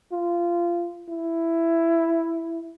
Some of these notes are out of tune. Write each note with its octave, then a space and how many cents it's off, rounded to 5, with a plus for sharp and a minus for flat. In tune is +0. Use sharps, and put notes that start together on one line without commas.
F4 -20
E4 +10